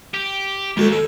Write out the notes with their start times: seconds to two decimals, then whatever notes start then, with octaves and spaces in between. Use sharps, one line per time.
0.14 G4
0.77 D#2 G#3 F#4 A4
0.92 A4